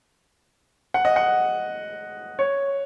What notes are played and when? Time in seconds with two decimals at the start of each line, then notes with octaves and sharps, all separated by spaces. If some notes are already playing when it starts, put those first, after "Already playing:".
0.94 F#5
1.05 D#5
1.16 F#5
2.39 C#5